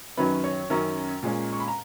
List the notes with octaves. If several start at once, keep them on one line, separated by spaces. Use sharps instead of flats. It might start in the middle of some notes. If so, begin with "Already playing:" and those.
F#2 D#3 F#3 C#4 B4 B5
C#5 C#6
F#2 D#3 F#3 C#4 A#4 A#5
A#2 G#3 C#4
C#6
B5
A#5